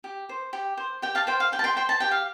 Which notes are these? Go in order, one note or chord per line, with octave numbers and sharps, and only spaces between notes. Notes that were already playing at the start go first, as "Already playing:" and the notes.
G4
C5
G4
C5
G4 G5
F5 A5
C5 G5
F5
G4 G5
A5
G5 C6
C5 G5 C6
A5
G4 G5
F5